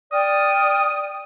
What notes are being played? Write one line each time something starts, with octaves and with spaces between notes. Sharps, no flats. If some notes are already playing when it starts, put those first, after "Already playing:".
D5 G5 D#6 F6